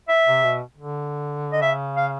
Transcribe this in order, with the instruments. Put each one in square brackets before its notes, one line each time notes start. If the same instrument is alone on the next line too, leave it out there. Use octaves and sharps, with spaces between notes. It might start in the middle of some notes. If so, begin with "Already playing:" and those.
[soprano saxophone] E5
[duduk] C3
B2
D3
[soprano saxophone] D#5
[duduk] C#3 [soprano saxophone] E5
[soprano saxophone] F5